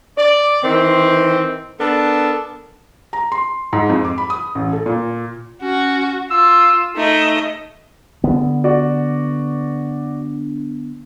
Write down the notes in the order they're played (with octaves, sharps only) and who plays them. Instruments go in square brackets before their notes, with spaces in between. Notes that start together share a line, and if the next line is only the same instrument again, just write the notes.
[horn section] D5
D#3 E3 C4
B3 D4 A4 A#4 A5
[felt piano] A#5
C6
G#2
F2
D6
B5
D#6
A1
A4
A#2
[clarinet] C#4 [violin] F#4
[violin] F4 [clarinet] E6
[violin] A3 D#5 [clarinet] D#4
[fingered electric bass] D3 B3
[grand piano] F#4 D5